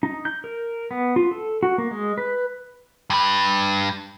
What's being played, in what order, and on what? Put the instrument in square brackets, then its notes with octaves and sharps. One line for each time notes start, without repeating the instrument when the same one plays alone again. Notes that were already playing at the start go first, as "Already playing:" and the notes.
[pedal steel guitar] D#4
G6
A#4
B3
F4
A4
F#4
A#3
G#3
B4
[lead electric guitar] G2 B4